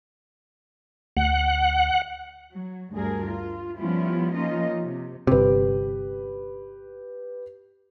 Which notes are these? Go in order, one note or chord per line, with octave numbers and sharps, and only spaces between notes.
D2 F#5
F#3
D2 G2 G#4 A#4
F4
F3 G3 B3 C#4 E4 F4
F3 A#3 C#4 D#4 F4 D#5
C3
G1 C3 G4 B4